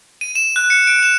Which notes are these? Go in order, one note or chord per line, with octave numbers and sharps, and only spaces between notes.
D#7
E7
F#6
C#7
D7
E7